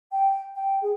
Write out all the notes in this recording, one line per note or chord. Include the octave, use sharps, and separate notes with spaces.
G5
G5
G#4